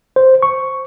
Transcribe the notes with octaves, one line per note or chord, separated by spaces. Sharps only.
C5
C#6